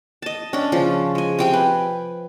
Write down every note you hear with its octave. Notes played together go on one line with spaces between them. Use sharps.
D#5 A5
C#4 D4
C#3 F3 C#4
G#3 G#5
C3 G5 G#5
B4